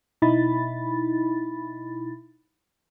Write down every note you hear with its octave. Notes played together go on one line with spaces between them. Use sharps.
B2 D#4 E4 B5 A6